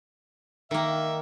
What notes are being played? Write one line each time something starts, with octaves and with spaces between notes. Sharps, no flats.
D#3 A#3 E5